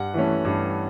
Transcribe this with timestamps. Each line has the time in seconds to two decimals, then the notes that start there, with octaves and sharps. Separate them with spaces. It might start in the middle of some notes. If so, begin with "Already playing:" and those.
Already playing: G2 F#5
0.14 E3 A3 C#4
0.45 G2